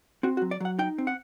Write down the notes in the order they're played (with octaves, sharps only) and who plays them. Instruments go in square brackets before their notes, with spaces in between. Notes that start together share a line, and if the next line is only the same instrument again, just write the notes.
[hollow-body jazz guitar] C4 F#4
F#4
F#3
D5
F#3 F#5
D#4 G5
C4
F#5